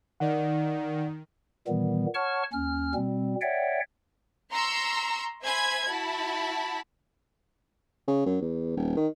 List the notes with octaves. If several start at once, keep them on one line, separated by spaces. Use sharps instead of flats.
D#3 D5 F#5
A#2 D#3 E3 G3 B3
C#5 F#5 A5 C#6 F6
D#2 C#4 F6
B2 G3 C4
C#5 D5 E5 F#5 G5
A#5 C6 C#6 E6
C5 E5 G#5 B5 G#6
E4 F#4 A5 B5
C#3
F#2
E2
D#1
D#3